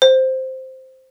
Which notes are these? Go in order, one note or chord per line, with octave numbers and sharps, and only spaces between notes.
C5